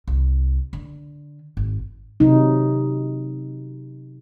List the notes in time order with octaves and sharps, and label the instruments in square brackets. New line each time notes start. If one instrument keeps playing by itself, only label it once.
[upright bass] C2
D3
G#1
[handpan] C3 F#3 D#4